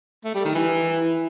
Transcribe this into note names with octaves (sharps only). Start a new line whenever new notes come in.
A3
G3
D#3
E3